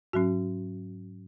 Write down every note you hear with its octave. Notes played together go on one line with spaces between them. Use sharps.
G#2 F#3 C#4 F#4